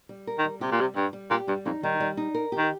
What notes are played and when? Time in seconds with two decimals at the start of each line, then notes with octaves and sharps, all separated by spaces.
0.09 G3
0.27 A#4
0.38 D#3
0.44 G3
0.61 C3 G4
0.72 A#2
0.79 C3 G3
0.96 G2 G3
1.13 G3
1.31 A#2 G4
1.48 G2 G3
1.66 F2 D#4
1.83 D#3 G3
2.00 G3
2.17 D#4
2.35 A#4
2.52 G4
2.58 D#3